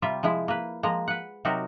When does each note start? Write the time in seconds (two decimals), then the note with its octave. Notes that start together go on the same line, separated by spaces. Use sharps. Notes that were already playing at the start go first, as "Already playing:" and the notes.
0.02 C3 G3 F4 E5
0.23 F3 G#3 E4
0.48 A#3 B4
0.83 F3 G#3 A#3 A#5
1.08 B4 F#5
1.45 C3 F#3 D#4 F#4 G4 A#4